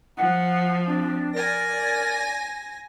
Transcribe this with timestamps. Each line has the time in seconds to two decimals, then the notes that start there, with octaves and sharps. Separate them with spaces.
0.18 F3 F#5
0.86 C4 D4
1.34 A#4 D5 G#5 A#6